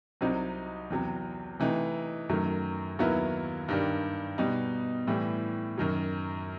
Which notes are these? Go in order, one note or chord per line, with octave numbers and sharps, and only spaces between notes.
C2 C3 F#3 C4 D#4
E2 C3 F#3
C3 E3 A3 D#4
F#2 D#3 F#3 A3
D#2 D#3 F#3 B3 E4
G2 D#3 G3
B2 G3 D#4
A2 E3 G3
F#2 D#3 F#3